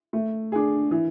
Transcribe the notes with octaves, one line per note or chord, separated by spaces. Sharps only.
A3
D4 G#4
E3